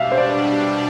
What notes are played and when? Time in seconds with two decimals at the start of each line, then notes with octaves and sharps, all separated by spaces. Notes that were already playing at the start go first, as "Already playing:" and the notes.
Already playing: B2 G3 D4 E5 F5
0.12 C5
0.18 D5